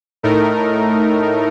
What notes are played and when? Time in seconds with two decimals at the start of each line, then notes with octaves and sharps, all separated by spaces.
0.23 A2 A3 D#4 A#4